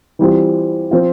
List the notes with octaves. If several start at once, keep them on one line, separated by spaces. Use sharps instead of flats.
E3 G3 C4 F4
F3 C4 F4